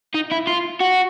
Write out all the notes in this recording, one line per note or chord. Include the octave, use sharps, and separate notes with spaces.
D#4
E4
F4
F#4